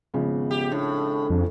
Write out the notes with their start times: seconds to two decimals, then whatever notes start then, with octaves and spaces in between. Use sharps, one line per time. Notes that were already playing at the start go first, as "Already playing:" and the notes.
0.14 G#1 C#3 F3 B3
0.51 G4
0.72 A2 D4
1.30 F2